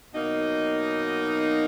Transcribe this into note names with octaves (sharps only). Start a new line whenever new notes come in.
B2 F#3 A#3 D#4